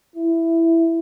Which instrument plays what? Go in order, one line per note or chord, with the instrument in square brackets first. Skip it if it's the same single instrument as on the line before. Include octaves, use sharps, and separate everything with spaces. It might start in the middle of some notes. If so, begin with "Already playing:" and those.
[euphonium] E4